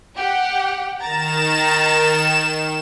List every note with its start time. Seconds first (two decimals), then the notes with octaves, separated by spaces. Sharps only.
0.16 G4 F#5
1.00 D#3 A#5 A6 E7